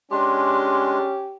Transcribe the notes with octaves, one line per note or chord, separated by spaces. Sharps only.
G#3 C#4 D4 G4 C6